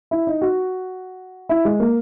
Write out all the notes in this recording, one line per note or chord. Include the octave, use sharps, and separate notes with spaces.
E4
D#4
F#4
E4
G#3
A#3